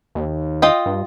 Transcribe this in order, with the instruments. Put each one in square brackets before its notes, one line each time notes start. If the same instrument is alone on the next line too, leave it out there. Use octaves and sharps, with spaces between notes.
[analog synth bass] D#2
[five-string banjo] F4 D#5 G5
[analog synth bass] G2